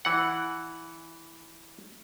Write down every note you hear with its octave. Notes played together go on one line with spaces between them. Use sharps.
E3 F#5